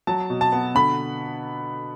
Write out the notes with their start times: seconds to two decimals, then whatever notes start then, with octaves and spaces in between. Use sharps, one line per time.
0.07 F#3 A5
0.30 B2
0.41 A5
0.52 B3
0.75 D3 B5